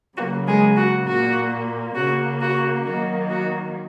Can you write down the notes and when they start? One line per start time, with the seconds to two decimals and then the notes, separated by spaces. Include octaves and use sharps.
0.17 C#3 F#3 A#3 F#4
0.47 G#3 G#4
0.76 F#4
1.06 A#2 A#3 F#4
1.95 C#3 A#3 F#4
2.40 F#4
2.84 D#3 F#3 A#3 F#4
3.28 F#4